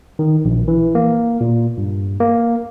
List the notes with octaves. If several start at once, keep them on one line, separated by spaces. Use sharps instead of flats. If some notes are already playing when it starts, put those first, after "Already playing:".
D#3
A#1
E3
A#3
A#2
G2
A#3